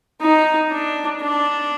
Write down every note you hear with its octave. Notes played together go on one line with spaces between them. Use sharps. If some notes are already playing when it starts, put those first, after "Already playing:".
D#4
D4
D4